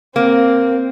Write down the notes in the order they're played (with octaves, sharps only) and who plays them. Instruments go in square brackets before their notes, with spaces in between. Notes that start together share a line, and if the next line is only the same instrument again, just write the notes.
[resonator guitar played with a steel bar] A#3 [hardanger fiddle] C4